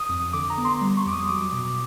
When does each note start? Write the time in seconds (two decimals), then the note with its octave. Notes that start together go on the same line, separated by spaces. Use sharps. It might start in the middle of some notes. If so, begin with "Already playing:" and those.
Already playing: D#6
0.09 F2
0.33 D3 D6
0.50 A#5
0.58 B3
0.65 C6
0.81 G3 C6
0.97 C#6
1.06 F2 D6
1.13 D#6
1.28 F#3 D6
1.52 B2